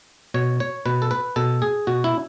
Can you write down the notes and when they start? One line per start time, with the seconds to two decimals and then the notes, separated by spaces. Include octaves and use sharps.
0.34 B2 C#5
0.60 C#5
0.86 B2 B4
1.02 A4
1.11 B4
1.36 B2 A4
1.62 G#4
1.87 B2 F#4
2.04 E4